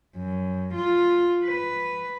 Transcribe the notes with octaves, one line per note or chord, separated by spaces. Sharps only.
F#2
F4
B4